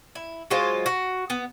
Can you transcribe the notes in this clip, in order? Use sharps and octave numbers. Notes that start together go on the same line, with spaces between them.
E4
F#3 G#3 F4 C5
F#4
B3